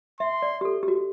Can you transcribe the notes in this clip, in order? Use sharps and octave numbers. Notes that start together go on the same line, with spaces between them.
E5 C6
D5
G4
A4
G4
F#4